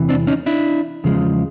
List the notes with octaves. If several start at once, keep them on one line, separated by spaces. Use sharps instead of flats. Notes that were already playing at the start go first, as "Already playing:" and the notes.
Already playing: E2 C3 E3
C4 D4
C#4 D#4
D4 E4
E2 C#3 F3 G#3